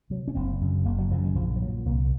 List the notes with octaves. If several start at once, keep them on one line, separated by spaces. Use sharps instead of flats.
C3 F#3
C#4
F#1 C4
F#2 C#3
F#1 A#3
F#3
F#2 C#3 F3
D#3
A#1 F3
F3
A#2 F#3
C2 A#3